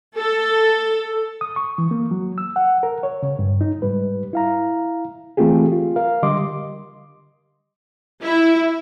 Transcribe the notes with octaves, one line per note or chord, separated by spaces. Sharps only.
A4
D#6
C#6
E3
A#3
F#3
E6
F#5
A#4
C#5
C#3
G2
D#4
G#2 G3 B4
E4 F5 A#5
E3 A3 C4 F4 G4 G#4
F4
A#4 F5
D3 G3 G4 D#5 C6 D6
E4